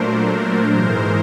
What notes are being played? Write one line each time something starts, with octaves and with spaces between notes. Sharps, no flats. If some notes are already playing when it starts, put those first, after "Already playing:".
Already playing: A#2 F#3 A3 D4 A#4 C5
G#2 E3 G#3 A#4 C5